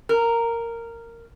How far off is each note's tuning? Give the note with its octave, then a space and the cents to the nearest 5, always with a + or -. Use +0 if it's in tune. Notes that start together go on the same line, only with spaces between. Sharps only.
A#4 -10